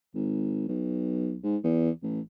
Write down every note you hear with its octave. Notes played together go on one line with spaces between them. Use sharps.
G#1
B1
G#2
E2
A1